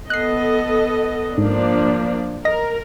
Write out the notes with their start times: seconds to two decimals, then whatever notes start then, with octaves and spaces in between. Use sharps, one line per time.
0.10 B3 A4 D#5 F#6 C7
1.38 G#2 F3 A#3 D4
2.45 A#4 D#5 A#6